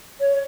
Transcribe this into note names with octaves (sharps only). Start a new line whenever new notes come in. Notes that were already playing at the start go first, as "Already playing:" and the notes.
C#5